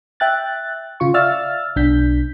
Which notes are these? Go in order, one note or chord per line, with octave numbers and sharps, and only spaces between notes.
E5 G5 F#6 A6
C#3 F4 C#6
D5 E5 F5 E6 F6 A6
B1 D4 G6 B6